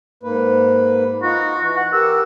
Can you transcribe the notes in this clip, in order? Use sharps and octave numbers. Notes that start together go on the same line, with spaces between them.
G#2 A#3 B4
D#4 F4 F#4
E3 F#4
F#5
G4 A#4 E6